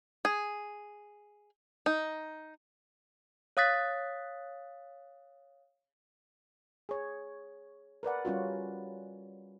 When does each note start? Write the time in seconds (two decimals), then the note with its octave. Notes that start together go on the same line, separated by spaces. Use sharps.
0.25 G#4
1.86 D#4
3.57 C#5 F5 D#6 F#6 A6 B6
6.89 G#4 C#5
8.03 A#4 B4 D5 F#5
8.25 G3 C#4 F4 F#4